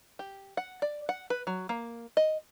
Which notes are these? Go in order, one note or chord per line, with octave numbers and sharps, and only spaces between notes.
G4
F#5
D5
F#5
B4
F#3
A#3
D#5